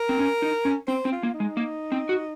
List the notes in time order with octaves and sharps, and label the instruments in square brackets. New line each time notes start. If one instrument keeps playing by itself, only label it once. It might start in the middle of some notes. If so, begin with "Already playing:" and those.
Already playing: [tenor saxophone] A#4
[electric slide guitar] C4
C#4
D#4
C#4
[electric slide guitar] C4 [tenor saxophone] C5
[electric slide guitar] C4
[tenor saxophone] F4
[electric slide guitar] A#3
[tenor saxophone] D#4
[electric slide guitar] G#3
A#3
C4
F#4